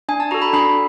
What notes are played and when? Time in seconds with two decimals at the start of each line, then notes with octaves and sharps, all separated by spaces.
0.09 D4 G#5
0.20 A5
0.31 F#4 A4 A#5
0.42 B5
0.53 D4 B5